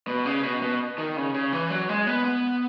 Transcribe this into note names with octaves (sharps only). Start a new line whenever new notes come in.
B2
C#3
B2
B2
D#3
C#3
C#3
E3
F#3
G#3
B3
B3